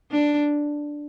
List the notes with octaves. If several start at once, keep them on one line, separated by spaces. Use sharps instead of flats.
D4